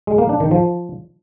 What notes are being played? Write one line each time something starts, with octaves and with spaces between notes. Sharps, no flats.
G#3
A#3
D4
D#3
F3